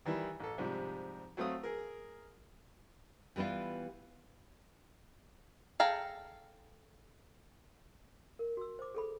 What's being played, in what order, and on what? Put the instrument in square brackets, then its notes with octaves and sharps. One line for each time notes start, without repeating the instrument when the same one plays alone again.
[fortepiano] D#3 E3 G3 E4
A1 A4
G#2 C3 F3 G3
F#3 A3 C4 F5 D#6
G#4 A#4
[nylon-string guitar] E3 G3 B3 E4 F4
[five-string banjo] G#4 A4 F5 G5 A#5
[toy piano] A#4
F#4 E6
C5 D6
G#4 A4 B5